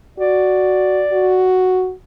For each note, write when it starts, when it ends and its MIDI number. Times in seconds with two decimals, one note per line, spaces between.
0.19 1.04 66
0.19 1.45 74
1.12 1.93 66